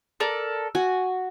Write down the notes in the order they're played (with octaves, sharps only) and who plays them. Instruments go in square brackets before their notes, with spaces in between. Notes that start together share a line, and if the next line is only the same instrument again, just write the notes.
[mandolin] A4 A#4 D5
[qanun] F#4 [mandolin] G#5